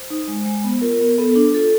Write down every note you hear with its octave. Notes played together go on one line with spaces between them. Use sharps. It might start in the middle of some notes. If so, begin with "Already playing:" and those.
Already playing: C5
D#4
G#3
G#3
B3
F4 A#4
B3
B3 A4
D4
F4 A4